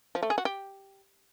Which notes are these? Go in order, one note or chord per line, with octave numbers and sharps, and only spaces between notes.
F3
A3
G#4
F#4
G4